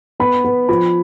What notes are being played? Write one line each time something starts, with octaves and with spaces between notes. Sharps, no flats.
B3 B5
B3
F3 B5